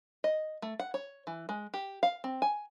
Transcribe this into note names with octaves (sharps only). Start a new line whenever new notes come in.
D#5
A3
F#5
C#5
E3
G#3
G4
F5
C4
G#5